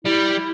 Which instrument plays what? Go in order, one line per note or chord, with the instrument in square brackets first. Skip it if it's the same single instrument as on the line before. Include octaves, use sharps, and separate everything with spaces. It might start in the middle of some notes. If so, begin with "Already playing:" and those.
[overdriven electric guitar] G3 [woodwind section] E4